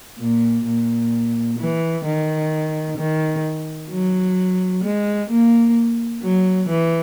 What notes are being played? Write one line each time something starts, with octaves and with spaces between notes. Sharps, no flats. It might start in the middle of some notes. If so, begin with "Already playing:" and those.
A#2
A#2
E3
D#3
D#3
F#3
G#3
A#3
F#3
E3